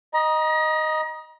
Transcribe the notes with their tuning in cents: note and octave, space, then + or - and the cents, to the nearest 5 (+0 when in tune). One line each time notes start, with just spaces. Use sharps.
D#5 +0 A#5 +35